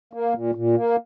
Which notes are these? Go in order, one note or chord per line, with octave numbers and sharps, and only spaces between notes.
A#3
A#2
A#2
A#3